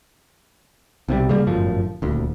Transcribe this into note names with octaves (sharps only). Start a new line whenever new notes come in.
B1 C3 F3 G3
C#3 G3 A#3
G1 F#2 A2 F3
D#1 D2